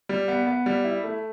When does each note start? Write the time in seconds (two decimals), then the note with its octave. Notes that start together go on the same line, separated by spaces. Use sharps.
0.09 G3
0.28 B3
0.47 B3
0.66 G3
0.84 E4
1.04 A3